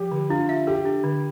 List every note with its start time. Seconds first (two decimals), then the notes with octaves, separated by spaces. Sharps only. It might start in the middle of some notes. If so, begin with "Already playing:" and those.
Already playing: F3 G4
0.11 D3
0.30 D4 F4
0.49 E5
0.67 G4 A4
0.85 D4
1.03 D3